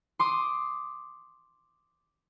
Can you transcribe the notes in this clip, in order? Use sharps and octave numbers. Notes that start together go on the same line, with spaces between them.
C6 D6 D#6